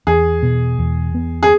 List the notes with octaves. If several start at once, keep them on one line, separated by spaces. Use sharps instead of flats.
E2 G#4
B2
E2
B3
G#4